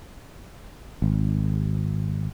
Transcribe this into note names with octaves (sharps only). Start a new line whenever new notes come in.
G#1